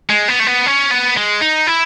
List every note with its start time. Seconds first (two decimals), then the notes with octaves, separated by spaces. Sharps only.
0.10 G#3
0.29 B3
0.40 A3
0.47 B3
0.66 C#4
0.91 B3
1.17 G#3
1.41 D#4
1.67 E4